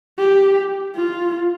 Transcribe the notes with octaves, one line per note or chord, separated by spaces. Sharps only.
G4
F4